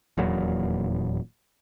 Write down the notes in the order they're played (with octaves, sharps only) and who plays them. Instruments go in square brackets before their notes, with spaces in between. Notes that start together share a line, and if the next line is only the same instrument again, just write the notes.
[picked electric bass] D#1 E2 A#2 F#3